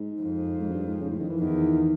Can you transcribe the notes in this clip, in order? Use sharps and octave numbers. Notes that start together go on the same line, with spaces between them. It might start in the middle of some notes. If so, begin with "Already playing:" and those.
Already playing: G#2
F2
G#2
F#2
G2
G#2
C#3
A2
D#3
E3
E2 D#3